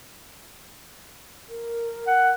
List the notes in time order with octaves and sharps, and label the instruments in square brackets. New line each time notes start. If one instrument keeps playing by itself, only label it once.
[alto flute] A#4
[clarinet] F#5